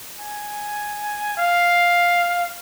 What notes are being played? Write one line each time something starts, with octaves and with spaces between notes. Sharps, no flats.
G#5
F5